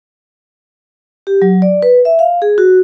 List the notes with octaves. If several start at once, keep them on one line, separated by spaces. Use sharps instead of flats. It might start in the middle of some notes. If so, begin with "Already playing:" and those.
G4
F#3
D5
B4
E5
F5
G#4
F#4